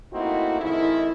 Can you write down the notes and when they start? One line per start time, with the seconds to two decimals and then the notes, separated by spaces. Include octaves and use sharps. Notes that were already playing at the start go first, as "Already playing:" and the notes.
0.12 A3 A#3 C4 D#4 E4 F#4
0.60 F2 D#3 G#3 E4